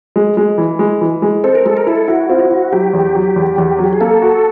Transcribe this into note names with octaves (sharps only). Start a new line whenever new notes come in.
G#3
G#3
E3
G#3
E3
G#3
C4 A4
A#4
G#3 A4
A#4
E4 A4
E4 F#4
C4 F4
F#4
E4
F#3 G4
E2
F#3
E2
E2
F#3
G4
G#4
A#3 A4
F#4